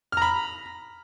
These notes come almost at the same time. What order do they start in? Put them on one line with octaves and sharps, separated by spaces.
F6 A#5 B5